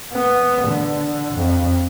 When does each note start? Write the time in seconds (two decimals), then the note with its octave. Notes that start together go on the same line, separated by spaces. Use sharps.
0.14 B3
0.67 D3
1.34 F2